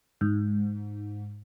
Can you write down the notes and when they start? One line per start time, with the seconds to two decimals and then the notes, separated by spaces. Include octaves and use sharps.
0.21 G#2